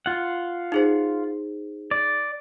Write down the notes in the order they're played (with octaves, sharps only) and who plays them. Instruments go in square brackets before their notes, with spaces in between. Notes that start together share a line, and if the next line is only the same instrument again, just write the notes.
[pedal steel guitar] F4 F#5
[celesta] D#4 G#4 C5
[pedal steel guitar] D5